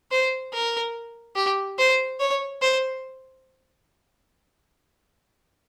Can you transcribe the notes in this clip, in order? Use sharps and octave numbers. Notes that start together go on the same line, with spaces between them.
C5
A#4
G4
C5
C#5
C5